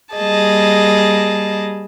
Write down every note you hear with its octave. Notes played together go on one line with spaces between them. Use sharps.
G3 A#3 G#4 D#5 A5